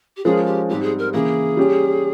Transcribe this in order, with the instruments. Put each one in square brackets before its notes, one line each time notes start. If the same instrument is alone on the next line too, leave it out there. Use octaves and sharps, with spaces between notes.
[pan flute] G4
[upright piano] F3 G#3 C#4 F4 A#4 [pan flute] G#4
[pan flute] G4
[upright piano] G#2 G3 C4 [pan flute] G4
[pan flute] G#4
A#4
[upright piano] C#3 E3 A#3 [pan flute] G#4
[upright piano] G3 C#4 G4